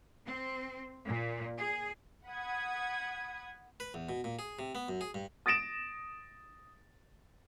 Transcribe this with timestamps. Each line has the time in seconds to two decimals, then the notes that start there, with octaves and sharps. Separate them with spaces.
0.25 C4
1.06 A#2
1.59 G#4
2.27 F#5 B5 D#6 G#6
3.80 B4
3.94 E2
4.09 B2
4.24 A#2
4.39 G#4
4.59 C3
4.75 B3
4.89 F#2
5.01 G#4
5.14 G2
5.46 D#6 A6 A#6 D7 E7